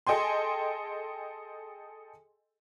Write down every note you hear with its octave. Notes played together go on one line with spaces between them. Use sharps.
G#4 A4 D#5 G5 G#5 C6